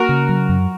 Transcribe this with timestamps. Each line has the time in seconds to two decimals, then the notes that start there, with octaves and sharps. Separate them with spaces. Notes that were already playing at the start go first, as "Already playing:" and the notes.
Already playing: A#3 F#4 A#4
0.09 C#3
0.29 F#3
0.49 F#2